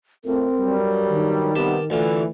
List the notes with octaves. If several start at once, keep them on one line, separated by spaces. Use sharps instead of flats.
F2 A2 C4 A#4
G2 F#3 G3
D#3
C3 G3 B3 G4 A5
D2 D3 E3 F4